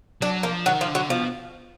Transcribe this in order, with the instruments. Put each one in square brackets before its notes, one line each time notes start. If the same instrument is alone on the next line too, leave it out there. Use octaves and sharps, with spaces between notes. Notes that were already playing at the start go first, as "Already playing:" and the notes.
[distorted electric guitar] F#3 [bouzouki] D4
[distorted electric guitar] F3 [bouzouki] A#3
[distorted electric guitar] D#3 [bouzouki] F#3
[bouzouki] F3
[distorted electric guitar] D3
[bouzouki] F#3
[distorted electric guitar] B2 [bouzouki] F3